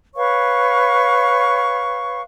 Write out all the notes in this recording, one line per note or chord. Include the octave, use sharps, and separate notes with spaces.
B4 C#5 F5 C#6